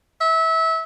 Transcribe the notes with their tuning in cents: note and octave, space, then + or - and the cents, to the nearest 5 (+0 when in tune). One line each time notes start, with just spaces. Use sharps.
E5 -25